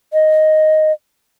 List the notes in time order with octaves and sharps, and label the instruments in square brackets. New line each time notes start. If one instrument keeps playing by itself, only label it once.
[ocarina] D#5